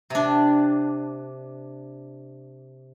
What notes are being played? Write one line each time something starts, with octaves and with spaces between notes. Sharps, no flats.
C3 D4